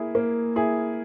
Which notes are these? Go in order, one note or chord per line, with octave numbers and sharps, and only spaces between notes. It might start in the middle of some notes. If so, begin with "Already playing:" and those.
Already playing: A#3 E4 G#4
A#3
E4 G#4